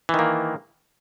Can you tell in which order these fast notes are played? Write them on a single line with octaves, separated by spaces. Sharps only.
E3 D#3 A#3